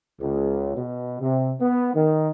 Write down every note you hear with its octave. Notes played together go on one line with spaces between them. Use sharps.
C#2
B2
C3
B3
D#3